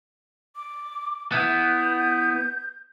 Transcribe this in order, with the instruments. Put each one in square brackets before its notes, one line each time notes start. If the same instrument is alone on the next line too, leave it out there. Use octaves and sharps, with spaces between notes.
[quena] D6
[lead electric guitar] B3 E4 [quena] G6